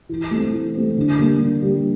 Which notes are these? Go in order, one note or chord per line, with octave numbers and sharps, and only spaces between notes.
E3
A3 C4
E3
A3 C4
D3
G3 A#3
D3
G3 A#3